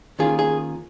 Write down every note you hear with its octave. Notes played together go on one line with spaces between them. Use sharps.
D#3 A#3 C#4 F4 G#4
G#4